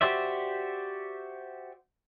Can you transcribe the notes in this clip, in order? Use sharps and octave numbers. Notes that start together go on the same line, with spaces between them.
F#4 G4 C5 D5 E5